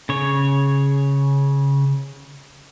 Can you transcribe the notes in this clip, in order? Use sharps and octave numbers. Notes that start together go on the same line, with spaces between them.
C#3 C#5